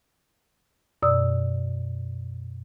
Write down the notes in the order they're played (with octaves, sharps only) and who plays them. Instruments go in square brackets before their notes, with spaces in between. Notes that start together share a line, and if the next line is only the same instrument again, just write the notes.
[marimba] F#2 B2 D5 D#6 E6